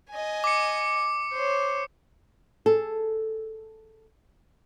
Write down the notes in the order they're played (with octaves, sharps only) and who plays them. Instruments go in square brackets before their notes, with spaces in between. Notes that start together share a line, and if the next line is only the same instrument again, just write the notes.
[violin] D#5 G#5
[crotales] D6 C#7
[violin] C5 C#5
[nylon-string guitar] G#4 A4